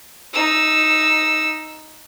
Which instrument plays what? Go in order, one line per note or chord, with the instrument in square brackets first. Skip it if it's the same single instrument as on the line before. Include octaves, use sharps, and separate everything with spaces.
[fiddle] D#4 E6